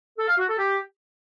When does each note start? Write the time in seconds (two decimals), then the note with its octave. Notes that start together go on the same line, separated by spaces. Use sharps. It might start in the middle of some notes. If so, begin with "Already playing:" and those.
0.18 A4
0.28 F5
0.38 F#4
0.48 A4
0.58 G4